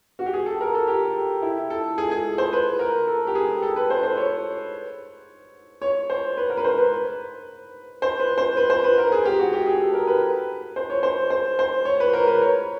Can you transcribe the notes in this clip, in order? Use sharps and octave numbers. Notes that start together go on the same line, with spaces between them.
F#4
G4
G#4
A4
A#4
A4
G4
E4
A4
G#4
G#4
C5
B4
A#4
A4
G4
G#4
A4
B4
C5
C5
C#5
C#5
C5
B4
A#4
B4
C5
B4
C5
B4
C5
B4
C5
B4
A#4
G#4
G4
F#4
G4
G#4
A4
A#4
B4
C5
C#5
C5
C5
C5
C#5
B4
A#4
B4
C#5